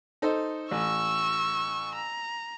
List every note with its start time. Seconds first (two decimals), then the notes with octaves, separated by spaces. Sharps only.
0.22 D#4 A4 C5
0.71 A1 C#6 E6
1.95 A#5